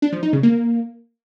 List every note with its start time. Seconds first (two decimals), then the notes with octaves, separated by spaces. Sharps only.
0.02 D4
0.13 F3
0.23 D#4
0.33 C#3
0.43 A#3